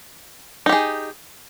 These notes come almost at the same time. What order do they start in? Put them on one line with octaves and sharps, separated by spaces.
D#4 G4 G#4